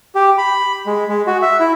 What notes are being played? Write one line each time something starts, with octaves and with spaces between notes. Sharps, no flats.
G4
B5
G#3
G#3
F#4
E5
E4